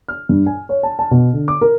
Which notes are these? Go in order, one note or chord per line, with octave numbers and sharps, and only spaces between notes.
F6
G2
G#5
C#5
A5
A5
B2
D3
D6
A#4